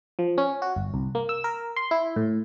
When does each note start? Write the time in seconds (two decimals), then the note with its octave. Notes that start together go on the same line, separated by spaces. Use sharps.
0.19 F3
0.38 C#4
0.62 F#4
0.76 G1
0.94 C2
1.15 A#3
1.29 E6
1.44 A#4
1.76 C6
1.91 E4
2.16 A2